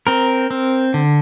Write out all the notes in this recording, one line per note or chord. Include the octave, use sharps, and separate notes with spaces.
C4 A#4
C4
D3